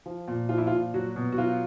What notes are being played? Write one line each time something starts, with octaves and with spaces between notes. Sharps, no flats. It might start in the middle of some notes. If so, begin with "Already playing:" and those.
F3
A#2
F3 F4
E4
F4
A#2
F#3 F#4
B2
F#4
F#3 F4